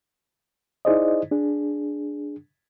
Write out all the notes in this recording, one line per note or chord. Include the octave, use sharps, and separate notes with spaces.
D#4 E4 G#4 C5 D5 D#5
D4 G#4